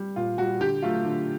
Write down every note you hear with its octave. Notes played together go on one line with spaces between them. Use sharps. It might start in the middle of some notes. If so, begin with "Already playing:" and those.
Already playing: G3
A#2 F4
G3 F#4
D3 G4
F#3 A3 F4
D3